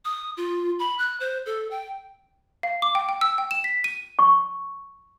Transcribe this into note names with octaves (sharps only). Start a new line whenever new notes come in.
D#6
F4
B5
F#6
C5
A4
G5
F5
D6
G5
G5
E6
G5
E7
B6
D#7
C#6